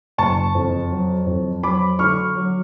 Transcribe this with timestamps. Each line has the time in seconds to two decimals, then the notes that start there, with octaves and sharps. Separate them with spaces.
0.18 F#1 A5 C#6
0.55 F2
0.91 F#3
1.27 F2
1.63 F#3 B5 D6
1.99 D3 C#6 F6
2.36 F#3